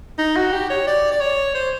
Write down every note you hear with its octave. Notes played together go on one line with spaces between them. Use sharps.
D#4
F#4
G4
C#5
D5
D5
C#5
C5